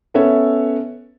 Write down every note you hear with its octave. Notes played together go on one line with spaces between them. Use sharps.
B3 C#4 A4 C#5 E5